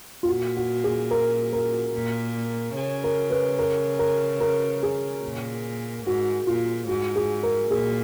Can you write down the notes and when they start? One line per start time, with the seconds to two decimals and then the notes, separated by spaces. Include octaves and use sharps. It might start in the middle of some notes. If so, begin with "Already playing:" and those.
0.23 F4
0.28 A#2 F#4
0.57 F#4
0.84 G#4
1.11 A#4
1.53 A#4
1.94 A#2
2.76 C#3
3.04 A#4
3.30 B4
3.59 A#4
3.99 A#4
4.40 A#4
4.83 G#4
5.24 A#2
6.05 G#2 F#4
6.47 A#2 F4
6.88 G#2 F#4
7.16 G#4
7.43 A#4
7.71 A#2 G#4